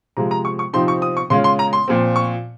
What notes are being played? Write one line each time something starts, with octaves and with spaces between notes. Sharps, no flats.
C3 F3 G#3 A#5
A#5
C#6
C#6
C3 F3 C4 D#4 C6
C#6
D#6
C#6
C#3 G#3 C#4 F4 C6
C6
A#5
C6
A#2 F3 C4
C#6